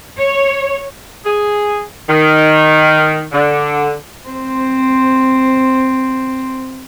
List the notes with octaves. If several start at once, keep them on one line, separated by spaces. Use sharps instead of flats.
C#5
G#4
D#3
D3
C4 C5